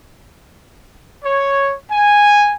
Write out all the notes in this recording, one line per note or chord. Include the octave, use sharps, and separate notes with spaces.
C#5
G#5